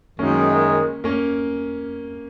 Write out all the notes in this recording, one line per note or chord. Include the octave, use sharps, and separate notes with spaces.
F#2 D#3 G#3 A#3 C#4
A#3 C#4